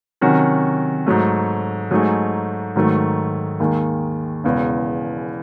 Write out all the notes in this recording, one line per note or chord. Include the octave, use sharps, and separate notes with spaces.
C3 D#3 F#3 C#4 F#4
G#2 F#3 A3
G#2 F#3 A3 D#4 G#4
G#2 D#3 F#3 A3
D#2 D#3 G#3
E1 E2 C#3